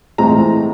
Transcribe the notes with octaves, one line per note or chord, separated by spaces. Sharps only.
A2 E3 G#3 C4 A#5